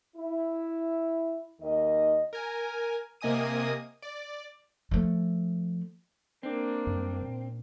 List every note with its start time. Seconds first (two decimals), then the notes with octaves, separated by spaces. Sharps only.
0.16 E4
1.61 D#2 D#3 D#5
2.33 A#4 G#5
3.21 C3 A#3 D#5 G#5 D#6 D#7
4.02 D5
4.91 F3 A3
6.43 A#3 C4 D4
6.87 F#2 G3
7.22 A#2